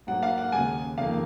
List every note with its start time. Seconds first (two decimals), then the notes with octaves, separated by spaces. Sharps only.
0.07 G#2 F#3 A#3 F#5
0.23 F5
0.38 F#5
0.52 D#2 C#3 G#3 G#5
0.98 F2 D#3 A#3 F5